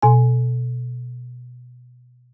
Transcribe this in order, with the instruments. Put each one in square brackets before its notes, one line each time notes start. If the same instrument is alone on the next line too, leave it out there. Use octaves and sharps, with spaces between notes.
[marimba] B2 G#5